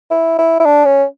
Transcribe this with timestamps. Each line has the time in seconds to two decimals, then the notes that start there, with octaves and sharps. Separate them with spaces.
0.11 E4
0.39 E4
0.60 E4
0.66 D4
0.85 C#4